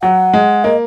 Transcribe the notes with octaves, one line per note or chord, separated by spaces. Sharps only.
F#3 F#5
G#3
A#3 D#5